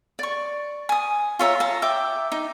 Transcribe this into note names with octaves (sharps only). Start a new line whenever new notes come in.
D5 C#6
G#5 D#6
F4 C#5 E5 A#5
A5 A#5
E5 G5 D6
D#4